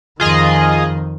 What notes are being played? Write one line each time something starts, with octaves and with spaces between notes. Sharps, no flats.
F2 D#3 F4 G#4 D#5